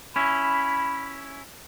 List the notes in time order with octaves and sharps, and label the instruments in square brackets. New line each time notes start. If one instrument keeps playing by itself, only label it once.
[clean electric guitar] C#4 E4 [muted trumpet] B5